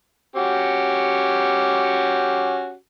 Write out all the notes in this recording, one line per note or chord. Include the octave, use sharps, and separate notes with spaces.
C#4 F#4 G4